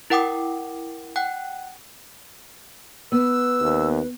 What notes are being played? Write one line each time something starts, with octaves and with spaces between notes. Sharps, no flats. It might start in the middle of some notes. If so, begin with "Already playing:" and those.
E4 A#4 F#5 G5 D6 D#6
F#5 G5 F#6
B3 B4 E6
D#2